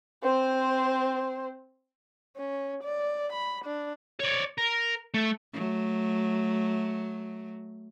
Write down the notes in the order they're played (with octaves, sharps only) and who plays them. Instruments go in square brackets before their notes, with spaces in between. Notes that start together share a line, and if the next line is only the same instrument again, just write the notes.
[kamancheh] C4 C5
[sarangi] C#4
D5
B5
D4
[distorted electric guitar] C#5 D5
A#4
A3
[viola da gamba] F#3 A3